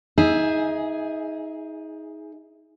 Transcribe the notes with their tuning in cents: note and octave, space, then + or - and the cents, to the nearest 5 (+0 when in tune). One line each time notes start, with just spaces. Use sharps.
D#4 +25 G#4 +0 E5 +0